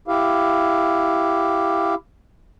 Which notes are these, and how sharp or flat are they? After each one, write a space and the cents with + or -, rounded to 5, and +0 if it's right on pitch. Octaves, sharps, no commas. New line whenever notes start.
E4 +5 G4 +0 F5 +0